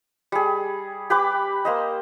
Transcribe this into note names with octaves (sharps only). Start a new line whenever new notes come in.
G3 G#4
G4 B4 B5 D6
A#3 C5 D#5